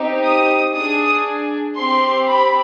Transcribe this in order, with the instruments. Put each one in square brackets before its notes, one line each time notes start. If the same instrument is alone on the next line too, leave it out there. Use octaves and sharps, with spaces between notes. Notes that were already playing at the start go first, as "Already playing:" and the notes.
Already playing: [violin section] C4 D#4 G4
D#6
D4 G#4 D#6
C4 G4 C6
B5